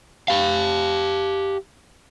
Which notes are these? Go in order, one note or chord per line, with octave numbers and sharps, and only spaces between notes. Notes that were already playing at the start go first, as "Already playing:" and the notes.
G4 F5